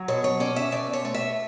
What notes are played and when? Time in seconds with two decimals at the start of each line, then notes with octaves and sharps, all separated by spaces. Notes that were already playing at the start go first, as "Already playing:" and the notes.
Already playing: F#3
0.08 B2 C#5
0.24 C#5
0.40 C#4 D5
0.56 E5
0.72 B2 D5
0.93 C#5
1.05 A3
1.14 E5